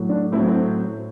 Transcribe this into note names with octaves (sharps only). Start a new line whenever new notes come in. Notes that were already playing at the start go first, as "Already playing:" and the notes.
Already playing: A2 F#3
D4
A2 F#3 C4 E4
C4